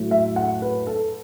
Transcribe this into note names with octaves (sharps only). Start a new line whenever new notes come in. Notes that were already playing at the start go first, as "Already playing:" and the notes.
Already playing: A2 F#3 A3
E5
F#5
B4
A4